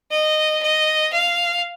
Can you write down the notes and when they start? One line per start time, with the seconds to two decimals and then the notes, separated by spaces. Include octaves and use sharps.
0.12 D#5
0.63 D#5
1.13 F5